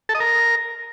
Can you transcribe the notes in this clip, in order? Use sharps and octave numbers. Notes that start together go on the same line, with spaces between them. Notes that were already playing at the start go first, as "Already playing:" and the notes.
A4
D#5
A#4